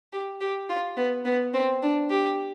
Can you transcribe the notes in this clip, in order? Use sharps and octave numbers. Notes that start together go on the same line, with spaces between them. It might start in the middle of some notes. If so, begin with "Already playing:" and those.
G4
G4
F4
B3
B3
C4
D4
G4